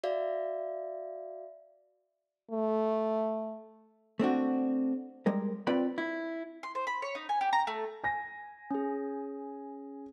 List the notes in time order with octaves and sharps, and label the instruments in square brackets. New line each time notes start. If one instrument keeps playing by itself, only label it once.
[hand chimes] F#4 D5 E5 F5
[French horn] A3
[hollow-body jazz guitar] A3 C4 D4 F#4
G3 G#3 A#4
C4 F4 B4 D5 G5 B5
E4
[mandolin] C6
C5
B5
C#5
D#4
G#5
G4
A#5
A3
[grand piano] G#5 A#6
[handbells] C#4 G#4